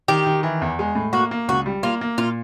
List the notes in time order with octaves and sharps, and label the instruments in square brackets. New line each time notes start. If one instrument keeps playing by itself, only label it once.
[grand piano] D#3 [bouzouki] G4
[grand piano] D#3
E3
E2
G#3
A2
[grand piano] A#3 [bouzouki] F#4
[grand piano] A#3
[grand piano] C#2 [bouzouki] F#4
[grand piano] G3
[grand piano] A#3 [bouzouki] F4
[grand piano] A#3
[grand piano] A#2 [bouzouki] F4